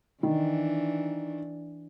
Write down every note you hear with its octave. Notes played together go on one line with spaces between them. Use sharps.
D#3 E3 D4